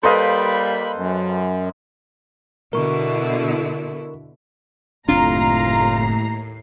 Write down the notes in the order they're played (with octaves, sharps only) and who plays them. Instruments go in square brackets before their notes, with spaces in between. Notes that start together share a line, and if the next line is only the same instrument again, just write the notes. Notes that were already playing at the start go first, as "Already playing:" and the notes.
[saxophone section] G3 A#3 [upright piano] A4 B4 F5 [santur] C5 D#5 [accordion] B5
[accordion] F#2
[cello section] B2 D3 E4 [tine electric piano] A#4 C#6
[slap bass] F#1 C4 D4 [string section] D#2 A#5 [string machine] A2 C7 [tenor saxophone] F4